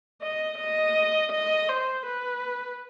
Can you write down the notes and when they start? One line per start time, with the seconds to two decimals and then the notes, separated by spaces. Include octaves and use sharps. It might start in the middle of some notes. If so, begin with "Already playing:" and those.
0.22 D#5
0.58 D#5
1.32 D#5
1.69 C5
2.06 B4